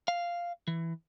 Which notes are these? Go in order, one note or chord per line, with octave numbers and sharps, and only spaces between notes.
F5
E3